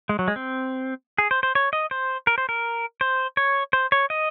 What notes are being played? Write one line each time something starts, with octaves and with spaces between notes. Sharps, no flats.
G#3
F#3
G#3
C4
G#4
C5
C5
C#5
D#5
C5
A#4
C5
A#4
C5
C#5
C5
C#5
D#5